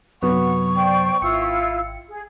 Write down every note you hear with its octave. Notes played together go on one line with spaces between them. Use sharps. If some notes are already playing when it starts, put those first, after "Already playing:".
F#2 C3 F#3 B3 F#5 C#6
C5 D5 G5
G#1 E4 F4 G5 E6 C#7
G#4